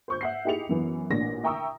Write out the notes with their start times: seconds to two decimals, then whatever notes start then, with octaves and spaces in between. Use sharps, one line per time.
0.08 C5 C#6 G6
0.21 E5 F#5 C7
0.45 D#4 E4 G4 G#4 C#7 F7
0.69 F#2 E3 B3
1.10 A1 A#2 D4 A#6
1.44 E5 G5 A#5 C#6 D#6 E6